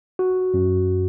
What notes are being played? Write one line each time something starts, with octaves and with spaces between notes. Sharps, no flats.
F#4
F#2